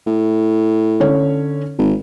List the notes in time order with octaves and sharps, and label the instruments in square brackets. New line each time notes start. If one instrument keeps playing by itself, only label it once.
[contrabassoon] A2
[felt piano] D3 C#4 C#5
[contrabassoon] G#1